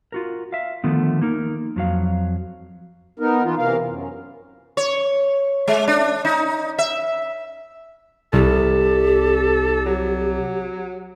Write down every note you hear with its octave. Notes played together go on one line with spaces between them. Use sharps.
F4 F#4 A#4
E5 F5
D3 D#3 F3 A3 B3
A#3 D#4 A#4
F2 F#3 F5
B3 D#4 A#4
E3 B3 F4
C3 E3 A#4 F5
F#2
C#5
G#3
D4
D#4
E5
C2 G4 A4
F#3